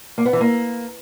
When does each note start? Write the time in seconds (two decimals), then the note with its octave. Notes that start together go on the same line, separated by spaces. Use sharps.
0.18 A#3
0.25 B3
0.33 E3
0.41 A#3